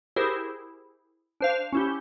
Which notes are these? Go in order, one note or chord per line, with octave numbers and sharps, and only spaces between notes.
E4 G4 G#4 A#4 C5
D4 C5 F5
C#4 E4 G4